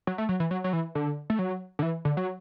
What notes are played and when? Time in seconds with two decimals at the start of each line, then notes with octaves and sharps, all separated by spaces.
0.07 F#3
0.18 A3
0.29 F#3
0.40 E3
0.51 F#3
0.64 F#3
0.73 E3
0.95 D3
1.30 A3
1.39 F#3
1.79 D3
1.82 E3
2.05 D3
2.17 F#3